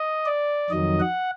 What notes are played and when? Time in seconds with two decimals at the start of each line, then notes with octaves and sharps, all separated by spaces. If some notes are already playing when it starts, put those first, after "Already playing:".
Already playing: D#5
0.26 D5
0.70 F2 D#3 F#3 D#5
1.00 F#5